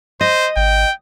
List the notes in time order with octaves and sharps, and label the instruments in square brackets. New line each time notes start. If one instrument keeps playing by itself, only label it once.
[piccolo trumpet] C5 [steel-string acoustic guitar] D#5
[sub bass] G#1 [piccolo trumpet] G5